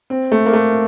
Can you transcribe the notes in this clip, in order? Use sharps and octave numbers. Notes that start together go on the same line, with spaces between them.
C4
A3
A#3
A3